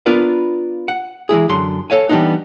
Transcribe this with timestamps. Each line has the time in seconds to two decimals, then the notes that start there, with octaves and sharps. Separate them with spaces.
0.06 B3 D4 F4 A#4 B4 F5
0.88 F#5
1.29 E3 G#3 E4 G#4
1.49 F#2 D3 C6
1.90 A4 C#5 F5 G#5
2.09 E3 G3 A3 B3 D4 D#4